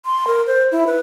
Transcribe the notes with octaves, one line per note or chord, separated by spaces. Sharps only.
C6
A#4
C5
E4
B4